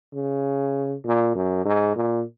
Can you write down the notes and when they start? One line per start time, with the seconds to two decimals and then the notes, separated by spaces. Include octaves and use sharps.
0.14 C#3
1.05 A#2
1.35 F#2
1.65 G#2
1.96 A#2